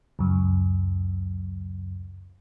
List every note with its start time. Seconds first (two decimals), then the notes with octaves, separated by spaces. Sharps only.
0.19 C#2 F#2